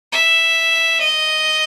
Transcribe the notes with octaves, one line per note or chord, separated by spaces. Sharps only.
E5
D#5